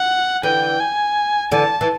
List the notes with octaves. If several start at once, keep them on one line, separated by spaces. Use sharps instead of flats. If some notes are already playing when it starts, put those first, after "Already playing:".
Already playing: F#5
D3 E3 G5
G#5
D3 E3 A5
E3